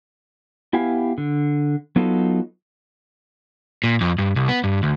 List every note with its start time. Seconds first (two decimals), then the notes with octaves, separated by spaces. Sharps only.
0.73 B3 E4 G4 F5 G#5
1.18 D3
1.96 F#3 B3 D#4 F4 A4
3.84 A#2
4.01 F2
4.18 G2
4.36 C2
4.48 B3
4.64 G2
4.83 D2